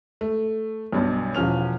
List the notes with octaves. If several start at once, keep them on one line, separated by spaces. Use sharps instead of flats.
A3
B1 G2 B2
E1 F3 C#4 F6 F7